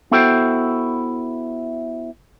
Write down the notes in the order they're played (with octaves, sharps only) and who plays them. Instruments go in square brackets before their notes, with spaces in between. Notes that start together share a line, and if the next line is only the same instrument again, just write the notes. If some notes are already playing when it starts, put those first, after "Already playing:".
[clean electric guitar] B3 E4 F#4 A4 C5 G5